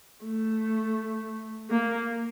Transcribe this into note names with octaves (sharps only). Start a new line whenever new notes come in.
A3
A#3